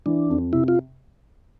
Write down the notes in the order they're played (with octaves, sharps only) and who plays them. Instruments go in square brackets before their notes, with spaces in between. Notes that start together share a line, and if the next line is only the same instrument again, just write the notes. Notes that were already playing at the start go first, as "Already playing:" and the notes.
[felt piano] E3 [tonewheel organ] D4
[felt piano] F2
[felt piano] C3 [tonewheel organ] E4
[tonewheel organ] F4